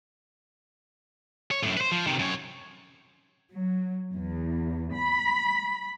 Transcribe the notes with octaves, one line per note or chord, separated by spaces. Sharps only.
C#5
F#2 A2
B4 C5
F3
C3 D#3
F#2 C#5
F#3
E2
B5